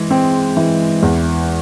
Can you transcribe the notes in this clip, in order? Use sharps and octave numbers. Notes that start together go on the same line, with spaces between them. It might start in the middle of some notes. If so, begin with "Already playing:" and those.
Already playing: E3 G#3
C4
E3
E2